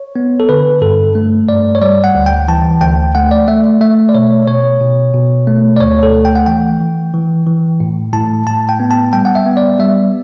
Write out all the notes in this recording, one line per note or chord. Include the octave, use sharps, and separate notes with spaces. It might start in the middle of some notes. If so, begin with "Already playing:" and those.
Already playing: C#5
B3
A4
D3 B4
G2 A4
A3
G2 D5
C#5
G3 D5
F#5
D2
G5
E3 A5
D2 G5
A3 F#5
D5
A3 E5
A3 E5
D5
B2 C#5
B2 C#5
B2
B2
A3
D5
D2 C#5
A4
A3
G5
F#5
E3 G5
E3
E3
E3
A2
A2 A5
A2 A5
G5
B3
A5
G3 G5
F#5
E5
B3
D5
G3 E5